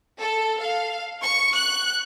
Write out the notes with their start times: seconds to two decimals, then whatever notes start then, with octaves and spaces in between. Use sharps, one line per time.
0.19 A4
0.59 F5
1.22 C#6
1.53 F#6